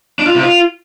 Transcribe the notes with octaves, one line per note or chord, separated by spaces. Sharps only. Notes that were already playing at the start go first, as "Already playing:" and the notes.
D4
F4
C3
F4